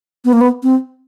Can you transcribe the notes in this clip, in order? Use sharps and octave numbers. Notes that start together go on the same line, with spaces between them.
B3
A#3
B3
C4